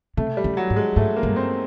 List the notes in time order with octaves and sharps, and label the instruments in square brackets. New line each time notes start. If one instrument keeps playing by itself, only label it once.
[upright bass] C3 [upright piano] A3
[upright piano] G3
[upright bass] C#3
[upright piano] F#3
[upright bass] G#2
[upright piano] G#3
[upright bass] G#2 [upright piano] A3
[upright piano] A#3
[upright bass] G2
[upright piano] C4